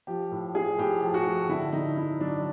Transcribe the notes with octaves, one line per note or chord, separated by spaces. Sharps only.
F3 G4
A2
F3 G#4
A2 G4
F3
F#4
A2
D3 E4
D3 D#4
D3 E4
F#3 D4